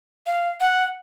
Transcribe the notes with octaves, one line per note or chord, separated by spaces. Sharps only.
F5
F#5